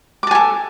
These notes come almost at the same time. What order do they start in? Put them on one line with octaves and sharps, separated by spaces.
D6 A5 G#5 A4